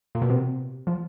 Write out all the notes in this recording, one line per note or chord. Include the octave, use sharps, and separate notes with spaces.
A#2
B2
C3
F3